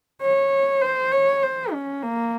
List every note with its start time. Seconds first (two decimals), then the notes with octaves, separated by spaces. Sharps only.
0.22 C#5
0.82 C5
1.12 C#5
1.43 C5
1.73 C#4
2.03 A#3